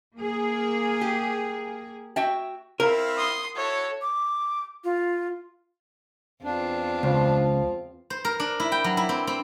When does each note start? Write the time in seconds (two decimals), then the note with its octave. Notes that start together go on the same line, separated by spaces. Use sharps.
0.16 A#3 G#4
1.01 G4
2.16 F#4 E5 G5
2.80 C4 E4 A#4 F5
3.17 C6 D#6
3.56 E4 F#4 A4 C#5
4.02 D6
4.84 F4
6.44 E2 C4 D4 F4
7.03 C#2 F3
8.10 C5
8.25 A#4
8.40 D4
8.60 E4
8.72 G5
8.84 F#3
8.97 E4
9.09 C4
9.27 C4